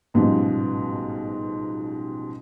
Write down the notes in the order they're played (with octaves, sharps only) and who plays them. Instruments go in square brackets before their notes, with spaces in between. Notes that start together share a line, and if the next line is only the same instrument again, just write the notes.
[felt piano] A1 G#2 B2 F3 G3